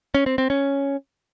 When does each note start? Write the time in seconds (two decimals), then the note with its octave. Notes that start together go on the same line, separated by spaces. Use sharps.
0.14 C#4
0.26 C4
0.38 C4
0.50 C#4